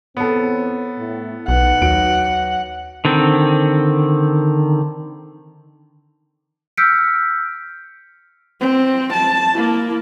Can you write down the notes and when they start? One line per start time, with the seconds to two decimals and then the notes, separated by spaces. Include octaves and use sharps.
0.17 E2 B3 C4 A4 C#5
0.98 A2
1.48 B1 D#4 B4 F#5
1.82 D#2 F#3 D7
3.05 D3 D#3 C4
6.77 E6 F6 G6 B6 C#7 D7
8.60 C4
9.13 A5
9.53 A#3 E4